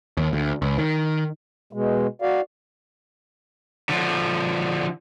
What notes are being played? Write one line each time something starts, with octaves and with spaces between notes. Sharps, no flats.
D#2
D2
C#2
D#3
B2 G#3
F#4 D5 F5
D3 F3